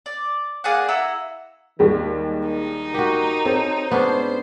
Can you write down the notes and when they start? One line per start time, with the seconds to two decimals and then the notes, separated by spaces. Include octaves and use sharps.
0.06 D5
0.64 A#3 G#4 D5 F#5
0.88 E4 F#5 A#5 E6
1.79 D#2 D#3 G3 G#3
2.48 D#4
2.94 F#4 G4 A#4
3.45 C4 A4 C#5
3.91 G#2 B3 C#4 D4 C5